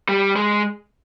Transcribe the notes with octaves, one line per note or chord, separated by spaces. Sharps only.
G3
G#3